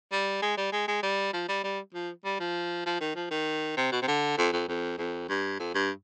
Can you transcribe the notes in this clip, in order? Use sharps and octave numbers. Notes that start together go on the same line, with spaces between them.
G3
G#3
G3
G#3
G#3
G3
F3
G3
G3
F3
G3
F3
F3
D#3
F3
D#3
C3
B2
C3
D3
F2
F2
F2
F2
G2
F2
G2